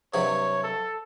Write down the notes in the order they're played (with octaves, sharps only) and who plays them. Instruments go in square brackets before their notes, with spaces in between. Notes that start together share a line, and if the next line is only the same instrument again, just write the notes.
[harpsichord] G2 C3 F#3 [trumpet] C#5
[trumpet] A4